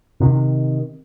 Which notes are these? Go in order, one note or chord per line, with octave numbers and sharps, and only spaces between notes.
C3 D#3